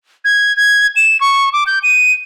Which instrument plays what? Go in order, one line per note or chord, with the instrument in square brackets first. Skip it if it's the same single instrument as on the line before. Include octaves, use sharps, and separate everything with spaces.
[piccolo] G#6
G#6
E7
C#6
D6
G6
D#7